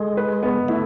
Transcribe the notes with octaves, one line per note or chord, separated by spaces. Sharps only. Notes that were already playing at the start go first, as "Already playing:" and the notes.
Already playing: G#3 A4
B4
B3
A3 E4